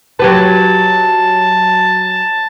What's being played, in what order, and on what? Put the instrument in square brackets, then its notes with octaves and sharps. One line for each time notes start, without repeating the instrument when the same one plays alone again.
[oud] F#3 G4 B4 [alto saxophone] A5